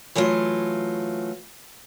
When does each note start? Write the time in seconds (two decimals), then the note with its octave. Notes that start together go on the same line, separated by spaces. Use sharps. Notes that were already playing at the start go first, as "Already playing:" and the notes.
0.15 E3 F#3 A3 F4